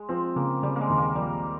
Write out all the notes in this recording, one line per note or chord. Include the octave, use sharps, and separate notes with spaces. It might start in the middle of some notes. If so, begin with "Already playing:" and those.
Already playing: G#3
F3 C4
C#3 A#3
C#3 G3
G#3 A#3
D#2
A#3
A#1 G3